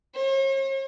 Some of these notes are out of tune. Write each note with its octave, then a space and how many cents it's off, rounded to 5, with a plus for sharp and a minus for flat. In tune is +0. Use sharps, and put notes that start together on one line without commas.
C#5 -45